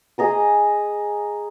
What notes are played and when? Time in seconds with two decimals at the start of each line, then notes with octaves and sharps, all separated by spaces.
0.18 G#4 D#5 A#5 D#6